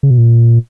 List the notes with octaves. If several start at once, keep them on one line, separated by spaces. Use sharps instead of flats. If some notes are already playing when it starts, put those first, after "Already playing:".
C#3
B2
A#2